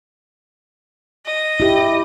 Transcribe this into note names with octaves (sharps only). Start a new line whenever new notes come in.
D#5
E4 G4